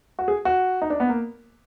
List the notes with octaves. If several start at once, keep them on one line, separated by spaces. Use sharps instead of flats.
F#4
G#4
F#4
D#4
D4
B3
A#3